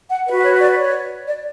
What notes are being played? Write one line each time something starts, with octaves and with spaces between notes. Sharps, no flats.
F#5
F#4 B4 E5
C#5
D5
C#5
D5